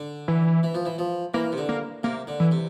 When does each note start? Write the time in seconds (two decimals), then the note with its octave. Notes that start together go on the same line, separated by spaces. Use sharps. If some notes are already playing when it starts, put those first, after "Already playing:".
Already playing: D3
0.28 E3
0.63 E3
0.74 F3
0.85 E3
0.98 F3
1.34 E3 A#3
1.52 C3
1.57 D3
1.69 A#3
2.03 C3 A#3
2.27 D3
2.40 E3
2.52 C3